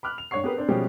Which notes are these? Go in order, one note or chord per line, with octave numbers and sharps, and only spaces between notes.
B5 D6 F6 F#6
F7
G2 D4 C#5 F#5 C#6 C7
B3 G4 G#4 A#4 B4
C4 D4 C5
B2 F3 G3 G#3 C#4 G4